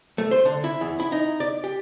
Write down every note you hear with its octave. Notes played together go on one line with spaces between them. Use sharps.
A3
C5
D3
E4
E2
E4
D#4
D5
G4